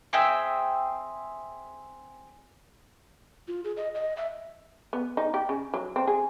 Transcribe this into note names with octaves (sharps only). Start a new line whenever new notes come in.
C4 G#4 E5 G5
F4
G#4
D#5
D#5
E5
B3
D#4
G4
C#3
F#3
C4
G#4